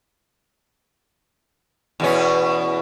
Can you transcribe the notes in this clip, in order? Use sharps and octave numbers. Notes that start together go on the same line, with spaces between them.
E2 B2 C#4